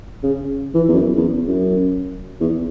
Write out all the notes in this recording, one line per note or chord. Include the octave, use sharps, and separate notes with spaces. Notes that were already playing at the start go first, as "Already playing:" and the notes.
C#3
E3
E2
F#2
E2
F#2
E2